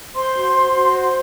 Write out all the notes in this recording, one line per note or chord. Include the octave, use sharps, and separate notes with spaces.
C5 C6
F#4
C5
F#4
C5